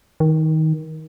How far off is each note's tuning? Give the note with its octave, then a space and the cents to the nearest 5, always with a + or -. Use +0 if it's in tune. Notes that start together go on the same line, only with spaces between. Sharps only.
D#3 +20